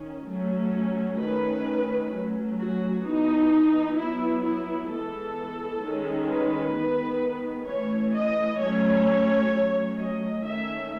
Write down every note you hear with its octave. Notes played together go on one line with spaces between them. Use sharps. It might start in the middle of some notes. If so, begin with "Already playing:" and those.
Already playing: D#3 C#4
F#3 A3 C#4
D#3 A3 C#4 B4
F#3 A3 C#4
F#4
E3 B3 D#4
F#3 B3 E4
E4
E3 G#3 B3 A4
D#3 G#3 C#4
B4
D#3 G#3 B3
E3 A3 C#4 C#5
D#5
F#3 A3 C#4 C#5
F#3 A3 C#4
D#5
D#3 A3 C#4 E5